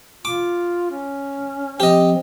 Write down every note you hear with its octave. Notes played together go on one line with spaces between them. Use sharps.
F4 D6
C#4
F3 C4 G4 D#5